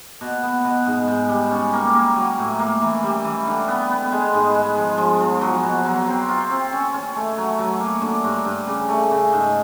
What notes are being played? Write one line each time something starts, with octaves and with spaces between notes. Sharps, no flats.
B2
B3
B2
G#2
G#2
G3
C#4
A#3
A#3
F#3
A2
A#3
E3
G3
E3
D3
B3
B3
G#3
G#2
G#3
F3
F3
F3
F#3
B2
F#3
C4
F4
C4
C#4
C#4
A3
F#3
F#3
A#3
D3
G2
G2
C#3
A3
C#3
G#2